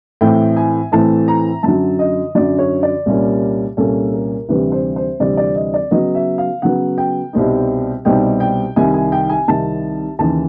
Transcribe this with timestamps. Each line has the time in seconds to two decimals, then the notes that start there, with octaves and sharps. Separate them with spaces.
0.21 A2 E3 A3 C4 E4 G5
0.57 G#5
0.92 A2 E3 A3 C4 E4 A5
1.28 A#5
1.63 F#2 D3 F#3 A5
1.99 D#5
2.35 F#2 D3 F#3 D5
2.59 C#5
2.83 D5
3.06 C2 A#2 G3 A#3 C#4
3.77 C2 A#2 G3 A#3 C#4 A4
4.13 A#4
4.49 D2 C3 E3 G3 C4 B4
4.72 C5
4.96 C5
5.20 D2 C3 E3 G3 C4 D5
5.37 D5
5.56 D#5
5.74 D5
5.91 C#3 F#3 B3 D#5
6.15 E5
6.38 F5
6.62 C#3 F#3 B3 F#5
6.98 G5
7.33 C2 B2 G3 C4 D#4
8.05 C2 B2 G3 C4 D#4 G5
8.40 G5
8.76 C2 C3 D#3 G#5
8.94 G#5
9.12 G5
9.29 G#5
9.48 C2 C3 D#3 A5
10.19 D#2 C#3 E3 A5